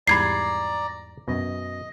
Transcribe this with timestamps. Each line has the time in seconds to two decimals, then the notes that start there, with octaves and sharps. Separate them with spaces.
0.07 E2 G#2 G3 D5 A#5 B5 G#6 C7
1.28 F#2 B2 D#5